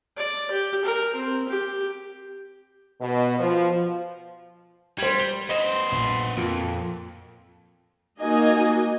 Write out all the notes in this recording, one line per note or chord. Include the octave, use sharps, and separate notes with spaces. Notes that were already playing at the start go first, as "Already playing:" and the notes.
D5
G4
A#4
C4
G4
B2
F3
G3 C5 G#6
G7
B3 C5 D#5
A#1
F2 A#2
A#3 D#4 F#4 D#5 G#5